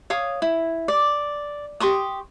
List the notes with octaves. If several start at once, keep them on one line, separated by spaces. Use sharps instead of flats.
C#5 F5 D#6
E4
D5
G4 C6 C#6 D#6